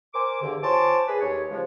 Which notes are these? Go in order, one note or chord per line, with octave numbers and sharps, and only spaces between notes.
A#4 C5 G#5 D6
E2 G2 D3
F4 C5 C#5 G#5 A5 D6
G#4 B4
D#2 C#5
C#2 F3 G#3